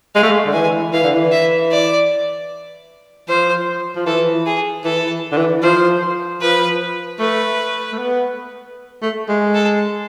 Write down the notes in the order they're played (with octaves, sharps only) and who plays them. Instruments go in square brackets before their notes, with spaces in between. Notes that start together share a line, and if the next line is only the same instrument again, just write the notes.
[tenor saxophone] G#3 [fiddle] F5
[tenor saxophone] A3
G#3
D3
[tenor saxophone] E3 [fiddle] G#5
[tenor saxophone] E3 [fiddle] F5
[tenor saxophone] D3
E3
[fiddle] E5
D5
[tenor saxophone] F3 [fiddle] C5
[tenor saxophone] F3
[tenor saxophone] E3 [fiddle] A4
[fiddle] G#4
[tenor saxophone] E3 [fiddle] A4
[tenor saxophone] D3
E3
[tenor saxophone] F3 [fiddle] C5
[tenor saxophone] F3 [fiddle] B4
[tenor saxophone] A3 [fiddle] B4
[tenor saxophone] A3
B3
A3
G#3
[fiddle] A4